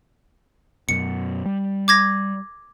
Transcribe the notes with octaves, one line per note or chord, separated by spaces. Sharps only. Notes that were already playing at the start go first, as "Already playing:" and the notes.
F#2 B2 C#7
G3
D6 G#6 A#6